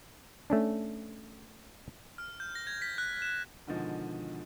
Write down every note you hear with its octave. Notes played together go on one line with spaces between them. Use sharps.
A3 C#4 D4
F6
G6
A#6
G#6
B6
F#6
E7
B2 D3 D#3 F3 G#3